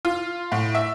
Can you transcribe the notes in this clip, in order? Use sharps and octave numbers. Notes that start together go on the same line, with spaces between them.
F4
A2
E5